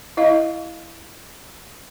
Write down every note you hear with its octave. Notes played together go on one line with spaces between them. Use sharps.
E4 D#5 F5